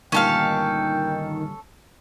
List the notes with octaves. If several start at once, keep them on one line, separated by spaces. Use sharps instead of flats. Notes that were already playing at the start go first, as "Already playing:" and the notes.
D2 G2 A#2 D#3 C#4 A4 F5 G5